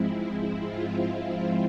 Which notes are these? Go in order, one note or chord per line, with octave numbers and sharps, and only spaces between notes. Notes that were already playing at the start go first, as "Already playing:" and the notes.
Already playing: G#2 F3 G#3 C4 E4
E4
F4